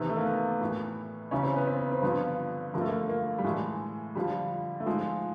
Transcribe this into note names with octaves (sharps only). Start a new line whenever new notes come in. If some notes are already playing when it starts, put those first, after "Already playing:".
Already playing: E2 C3 D#3 B3
A3
A#3
B3
A2 E3
E2 C#3 E3 C#4
C4
B3
C4
C4
G2 D3 F3 B3
G2 D3 F3 A#3
A3
A#3
A#3
G3
A2 E3 G#3
F2 D3 F3 G3
A3
G#2 F3 G#3